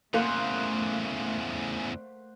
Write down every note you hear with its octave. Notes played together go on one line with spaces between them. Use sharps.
E2 C#3 A3 A#3 C5 F#5